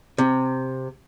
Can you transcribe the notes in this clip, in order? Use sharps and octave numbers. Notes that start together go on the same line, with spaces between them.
C3